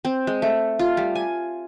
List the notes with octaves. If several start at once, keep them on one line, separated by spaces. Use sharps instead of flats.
C4
G#3
A3
F4
G3
G#5